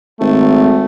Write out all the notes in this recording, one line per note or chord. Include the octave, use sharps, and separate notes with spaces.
G#1 A3